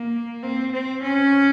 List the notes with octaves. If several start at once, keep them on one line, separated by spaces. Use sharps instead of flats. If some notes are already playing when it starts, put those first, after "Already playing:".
Already playing: A#3
C4
C4
C#4